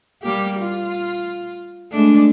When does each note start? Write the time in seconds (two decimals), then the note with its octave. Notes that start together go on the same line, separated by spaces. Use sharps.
0.23 G3 A#3 G4
0.58 F4
1.91 G#3 A3 D4